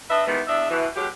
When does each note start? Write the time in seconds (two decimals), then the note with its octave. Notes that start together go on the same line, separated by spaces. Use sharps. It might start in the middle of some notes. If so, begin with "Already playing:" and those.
0.10 D4 B4 D#5 E5
0.27 D#3 E3 G3 G#3 B3
0.47 E2 D4 D#5 E5
0.70 B2 E3
0.95 B2 F#3 G#3 G4